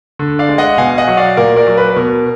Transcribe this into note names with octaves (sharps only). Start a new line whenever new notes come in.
D3
D5 F5
G#3
D#5 F#5
B2 F5 G#5
D#5 F#5
F#3
D5 F5
A#2 A#4 D5
A#4 D5
F#3
B4
B4
B2 A#4